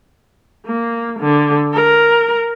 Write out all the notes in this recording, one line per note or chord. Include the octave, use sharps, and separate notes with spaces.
A#3
D3
A#4